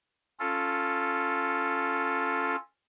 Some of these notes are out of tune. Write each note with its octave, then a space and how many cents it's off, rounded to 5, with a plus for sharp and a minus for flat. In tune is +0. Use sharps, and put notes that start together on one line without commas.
C#4 -10 F4 +0 A4 +0